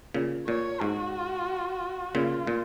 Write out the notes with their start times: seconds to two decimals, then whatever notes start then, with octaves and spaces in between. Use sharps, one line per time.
0.14 A#2 C#3
0.47 A#2 C#5
0.81 G#2 F#4
2.15 A#2 C#3 F4
2.47 A#2